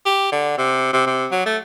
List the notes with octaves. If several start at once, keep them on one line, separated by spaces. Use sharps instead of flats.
G4
D3
C3
C3
C3
F#3
A3